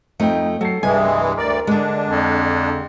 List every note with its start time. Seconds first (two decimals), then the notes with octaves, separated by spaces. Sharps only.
0.20 F2 A3 D#4 D#5 G5
0.61 F#3 A4 C7
0.83 C2 G2 E3 G#3 G#5
1.38 D2 A#4 D5
1.67 D3 G#3 D4
2.10 F2